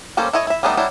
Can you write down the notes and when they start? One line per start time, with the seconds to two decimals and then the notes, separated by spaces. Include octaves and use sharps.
0.17 G3 A#3 C#4 A4 C5
0.33 E4 A4 C#5 D#5
0.47 E4 E5
0.63 G3 A3 B3 D4 D#4
0.77 F#3 G3 D4 E4 F#4